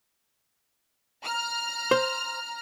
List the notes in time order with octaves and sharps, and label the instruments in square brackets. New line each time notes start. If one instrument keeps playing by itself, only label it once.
[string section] A#5 F6
[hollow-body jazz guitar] C5